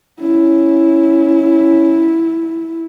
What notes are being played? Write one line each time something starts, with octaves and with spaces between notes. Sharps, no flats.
C#4 E4